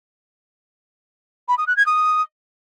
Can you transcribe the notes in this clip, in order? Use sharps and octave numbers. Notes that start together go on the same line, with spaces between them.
B5
D#6
F#6
G#6
D#6